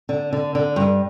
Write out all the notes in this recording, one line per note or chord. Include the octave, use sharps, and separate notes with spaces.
D3
D3
D3
G2